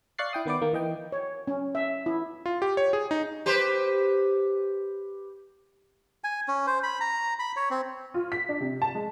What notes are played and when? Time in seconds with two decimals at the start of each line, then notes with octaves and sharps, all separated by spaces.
0.18 D5 F5 C#6 F#6 A6 C7
0.33 E4 G5 D#6
0.46 D#3 B3 B4 D5 D6
0.61 D#3 A#3
0.73 E3 D#5 G5
1.12 C#5
1.47 C#4
1.75 E5
2.06 E4
2.46 F4
2.62 G4
2.77 C#5
2.93 G#4
3.11 D#4
3.46 G4 B4 C5
6.24 G#5
6.48 C#4
6.67 C5
6.83 B5
7.01 A#5
7.39 B5
7.56 C#5
7.70 C4
8.14 F4
8.32 B6
8.49 D4
8.60 C3
8.82 A5
8.95 G#3